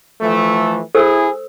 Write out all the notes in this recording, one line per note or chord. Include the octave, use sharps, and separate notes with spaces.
E3 F3 A3
E4 G#4 A4 C5 E6